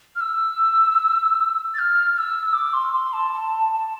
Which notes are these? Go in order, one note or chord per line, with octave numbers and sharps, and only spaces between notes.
F6
E6
A6
F6
F6
E6
D6
C6
C6
A5
A5
A5